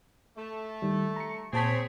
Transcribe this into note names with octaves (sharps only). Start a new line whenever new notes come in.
A3
D#3 G3
A#5 C#7
A#2 C4 G#4 C#5 A5 B6